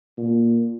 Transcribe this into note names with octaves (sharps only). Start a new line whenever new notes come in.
A#2